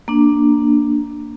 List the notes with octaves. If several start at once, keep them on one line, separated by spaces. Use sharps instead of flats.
A#3 D4